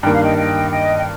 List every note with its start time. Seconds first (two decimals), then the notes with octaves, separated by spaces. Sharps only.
0.03 G2 D#3 A#3 G5
0.13 F5
0.23 D#5 G5
0.37 D#5 G5
0.71 D#5 G5
0.98 G5